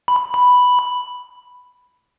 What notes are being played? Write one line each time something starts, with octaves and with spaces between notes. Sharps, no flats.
B5
B5